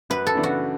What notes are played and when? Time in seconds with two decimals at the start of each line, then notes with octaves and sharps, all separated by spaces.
0.10 F#2 B4
0.27 A4
0.35 C#3 E3 B3 D4
0.43 F#4